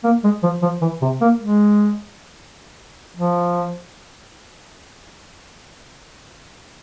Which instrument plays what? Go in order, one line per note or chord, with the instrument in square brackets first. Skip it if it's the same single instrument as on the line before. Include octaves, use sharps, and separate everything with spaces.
[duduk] A#3
G#3
F3
F3
E3
C3
A#3
G#3
F3